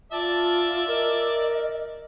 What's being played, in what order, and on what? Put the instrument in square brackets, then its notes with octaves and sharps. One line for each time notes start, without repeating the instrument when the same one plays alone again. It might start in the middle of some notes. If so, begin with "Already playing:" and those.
[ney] F4 [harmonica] D5 E5 [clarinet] A5
[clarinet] A#4 [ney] D#5